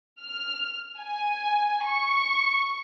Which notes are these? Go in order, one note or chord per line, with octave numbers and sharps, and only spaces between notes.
F6
G#5
C#6